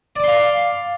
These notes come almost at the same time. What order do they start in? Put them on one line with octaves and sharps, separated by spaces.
D5 D6 C6 F5